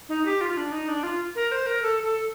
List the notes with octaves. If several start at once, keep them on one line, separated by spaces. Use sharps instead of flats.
D#4
G4
F4
D4
D#4
D4
F4
A#4
C5
A#4
A4
A4